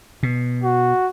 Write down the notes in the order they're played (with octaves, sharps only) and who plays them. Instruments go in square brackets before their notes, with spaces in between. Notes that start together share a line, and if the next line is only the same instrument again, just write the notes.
[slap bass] B2
[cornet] F#4